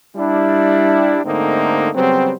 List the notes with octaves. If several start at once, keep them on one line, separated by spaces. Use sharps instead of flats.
G3 D4 E4
G#2 D3 A3 A#3 C4 D#4
C#3 F#3 G3 B3 C4